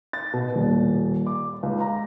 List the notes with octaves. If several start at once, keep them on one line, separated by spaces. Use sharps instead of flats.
A6
B2
D#1
D6
C#2
A#5